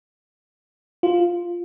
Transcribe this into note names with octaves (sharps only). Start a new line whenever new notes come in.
F4